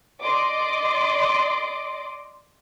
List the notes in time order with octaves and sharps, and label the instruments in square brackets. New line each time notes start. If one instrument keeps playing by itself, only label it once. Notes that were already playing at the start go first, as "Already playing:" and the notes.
[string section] D5 D#5 C6 D6